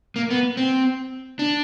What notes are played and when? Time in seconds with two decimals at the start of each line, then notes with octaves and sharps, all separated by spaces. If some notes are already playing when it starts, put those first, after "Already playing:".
0.16 A#3
0.30 B3
0.57 C4
1.39 D4